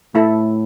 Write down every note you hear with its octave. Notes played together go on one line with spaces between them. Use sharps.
A2 A3 E4 A4